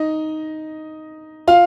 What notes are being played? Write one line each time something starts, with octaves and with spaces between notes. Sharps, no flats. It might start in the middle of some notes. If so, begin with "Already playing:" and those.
Already playing: D#4 D#5
F4 F5